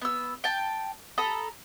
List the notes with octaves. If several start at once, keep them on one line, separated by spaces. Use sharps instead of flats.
B3 E6
G5 A5
A4 A#5 B5 D#6